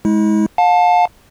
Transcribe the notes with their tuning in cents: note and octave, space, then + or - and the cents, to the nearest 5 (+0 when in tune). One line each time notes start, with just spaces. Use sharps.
G#3 +15 E4 -40
F5 +40 A5 +0